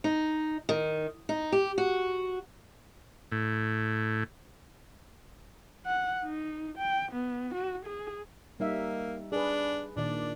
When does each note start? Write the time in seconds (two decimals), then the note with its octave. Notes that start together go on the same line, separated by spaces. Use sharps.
0.04 D#4
0.69 D#3
1.29 D#4
1.52 G4
1.78 F#4
3.32 A2
5.86 F#5
6.24 D#4
6.78 G5
7.12 B3
7.54 F#4
7.86 G#4
8.60 G3 A#3 D#4 E5
9.32 D4 G#4 B4
9.97 A#2 D#3 D4 D5